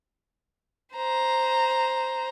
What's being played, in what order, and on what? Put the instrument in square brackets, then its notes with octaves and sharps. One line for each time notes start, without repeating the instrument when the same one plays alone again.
[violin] C5 A#5